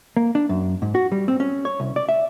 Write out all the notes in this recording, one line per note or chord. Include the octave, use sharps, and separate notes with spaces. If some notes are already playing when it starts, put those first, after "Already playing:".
A#3
D4
F#2
G#2
F#4
G3
C4
C#4
C#5
C2
D5
E5